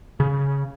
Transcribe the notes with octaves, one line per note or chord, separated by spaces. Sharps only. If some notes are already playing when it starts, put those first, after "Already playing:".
C#3